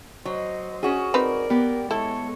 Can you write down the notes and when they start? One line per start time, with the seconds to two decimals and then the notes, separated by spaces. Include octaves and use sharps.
0.25 F#3 C5 D#5
0.83 C#4 F#4 G#4
1.14 C4 D#4 A#4 B4 D5
1.50 B3 G4
1.91 G#3 E4 A4 C#5